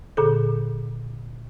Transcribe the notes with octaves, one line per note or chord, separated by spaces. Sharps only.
A#2 D3 G#4 A4